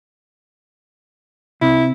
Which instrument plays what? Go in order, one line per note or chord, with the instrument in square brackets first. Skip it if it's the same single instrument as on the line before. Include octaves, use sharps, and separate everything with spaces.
[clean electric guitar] C3 [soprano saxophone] E4